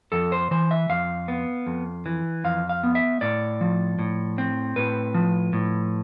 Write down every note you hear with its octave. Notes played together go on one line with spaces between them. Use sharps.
F2 A4
C5
E3 C5
E5
F2 F5
B3
F2
E3
F2 F5
F5
B3
E5
A2 D5
F3
A2
C4
A2 B4
F3
A2